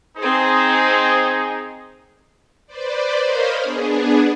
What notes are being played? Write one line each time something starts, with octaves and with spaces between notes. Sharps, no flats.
C4 D#4 G#4 C5
B4 C5 D5
A#4 C5 C#5 D#5 F5 B5
B3 D4 G#4